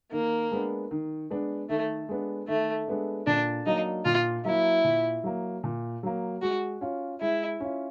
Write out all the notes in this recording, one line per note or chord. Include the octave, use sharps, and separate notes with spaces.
D#3 A#3
G#3 B3 D4
D#3
G#3 B3 D4
D#3 A3
G#3 B3 D4
D#3 A3
G#3 B3 D4
A#2 D4
F#3 A#3 D#4
A#2 F4
F#3 A#3 E4
A#2
F#3 A#3
A#2
F#3 A#3
G#3 F#4
C#4 F4
G#3 E4
C#4 F4